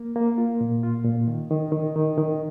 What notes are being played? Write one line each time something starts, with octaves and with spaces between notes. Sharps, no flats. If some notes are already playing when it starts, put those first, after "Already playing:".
Already playing: A#3
A#3
F4
A#2
F4
A#2
D#3
D#3
D#3
D#3
D#3